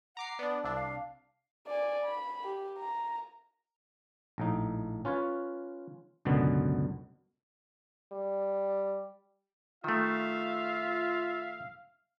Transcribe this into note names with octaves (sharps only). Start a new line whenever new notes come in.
F#5 A#5 D6 C7
B3 D4 D5
C2 D4 E6
F5
D5 G#5
B5
G4
A#5
A#1 A2 D#4
C#4 F4 B4 C#5
C#2 F#2 B2 D3 B3
G3
D#3 A3 F4 E5 F5